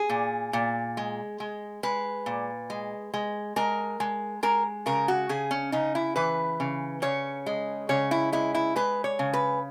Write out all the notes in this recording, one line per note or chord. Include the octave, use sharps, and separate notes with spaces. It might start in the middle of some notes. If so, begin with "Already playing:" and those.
Already playing: G#4
A#2
A#2
G#3
G#3
G#3 B4
A#2
G#3
G#3
G#3 A#4
G#3
G#3 A#4
C#3 A#4
F#4
C#3 G#4
C#4
C#3 D#4
E4
E3 B4
C#3
C#3 C#5
G#3
C#3 C#5
E4
G#3 E4
E4
G#3 B4
C#5
C#3
B4